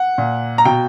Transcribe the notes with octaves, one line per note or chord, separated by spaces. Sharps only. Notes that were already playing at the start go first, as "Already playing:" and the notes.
Already playing: F#5
A#2
A#5
B2 G5